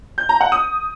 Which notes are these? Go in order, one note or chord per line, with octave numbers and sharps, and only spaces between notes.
G6
A#5
F#5
D#6